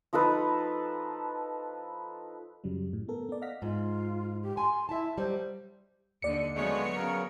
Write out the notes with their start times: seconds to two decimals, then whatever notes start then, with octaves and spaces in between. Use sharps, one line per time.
0.13 F3 D#4 A4 B4
2.64 F#2 C#3 F#3 G3
2.93 A2
3.08 B3 A4 A#4
3.29 B3 D5
3.41 D#5 F5 F#5 F6 A#6 B6
3.62 G#2 F4
4.43 G4
4.57 G#5 C6
4.89 E4 E5 A5
5.17 F#3 G3 C5
6.22 D#2 D3 D5 C#7
6.55 C#3 F#3 G#3 A3 B3 C#5
6.96 C#3 A#4